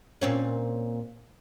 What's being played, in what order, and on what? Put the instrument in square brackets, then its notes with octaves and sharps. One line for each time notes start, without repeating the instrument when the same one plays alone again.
[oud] A#2 C4 C#4